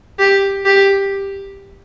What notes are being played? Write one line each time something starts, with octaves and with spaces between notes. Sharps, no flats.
G4
G4